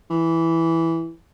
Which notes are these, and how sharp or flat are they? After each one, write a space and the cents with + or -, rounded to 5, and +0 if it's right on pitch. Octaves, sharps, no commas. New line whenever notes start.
E3 +0